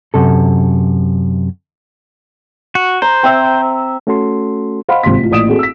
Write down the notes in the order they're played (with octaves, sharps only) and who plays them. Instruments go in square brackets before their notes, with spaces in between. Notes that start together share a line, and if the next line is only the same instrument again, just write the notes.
[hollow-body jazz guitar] F#2 C3 A4
[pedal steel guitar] F#4
[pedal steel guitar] C5 [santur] A#5
[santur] C4 E5
[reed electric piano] A3 C#4 F#4 A4 C6
[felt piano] C5 D#5 F5 F#5 B5 C6
G#1 C3 F4 C6 B6
A1 F4
A1 A#2 D5 D#6 D7 E7
C4 F#4 G#4 A4
E6 B6